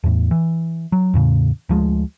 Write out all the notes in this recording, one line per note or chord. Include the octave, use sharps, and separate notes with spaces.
E2 A2
E3
F#3
E2 A2 C#3
D2 F3 G#3